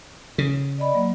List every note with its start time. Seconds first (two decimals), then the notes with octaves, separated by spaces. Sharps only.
0.38 C#3
0.79 D5 D#5 B5
0.94 F#3 A#3